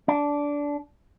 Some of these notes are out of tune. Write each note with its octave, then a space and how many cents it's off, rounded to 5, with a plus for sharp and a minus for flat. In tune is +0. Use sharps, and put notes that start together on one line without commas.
D4 -15